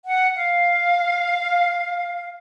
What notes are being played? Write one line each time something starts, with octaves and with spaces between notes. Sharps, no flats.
F#5
F5